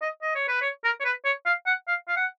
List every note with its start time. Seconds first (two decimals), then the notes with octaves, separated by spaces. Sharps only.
0.02 D#5
0.22 D#5
0.35 C#5
0.48 B4
0.62 C#5
0.84 A#4
1.00 C#5
1.05 B4
1.25 C#5
1.46 F5
1.66 F#5
1.88 F5
2.08 F5
2.17 F#5